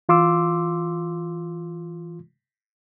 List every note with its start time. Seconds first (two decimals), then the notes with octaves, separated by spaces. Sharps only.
0.09 E3 F4 C6 D6 E6